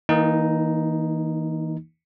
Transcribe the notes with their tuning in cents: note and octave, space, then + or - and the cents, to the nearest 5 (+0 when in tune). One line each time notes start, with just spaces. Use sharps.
E3 -35 A#3 +0 D#4 +0